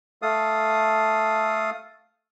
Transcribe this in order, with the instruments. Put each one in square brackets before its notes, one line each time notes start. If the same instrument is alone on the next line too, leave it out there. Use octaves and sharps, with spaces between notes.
[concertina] A3 A4 F5 D#6